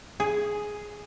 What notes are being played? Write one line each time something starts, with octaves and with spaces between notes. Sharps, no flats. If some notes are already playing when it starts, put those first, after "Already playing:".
G#4